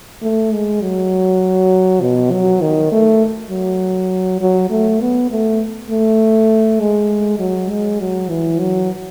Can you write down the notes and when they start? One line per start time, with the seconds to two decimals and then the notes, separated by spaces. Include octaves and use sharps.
0.22 A3
0.52 G#3
0.82 F#3
2.02 B2
2.32 F#3
2.62 D#3
2.92 A3
3.51 F#3
4.41 F#3
4.70 A3
5.01 B3
5.31 A3
5.90 A3
6.80 G#3
7.39 F#3
7.70 G#3
8.00 F#3
8.29 E3
8.60 F#3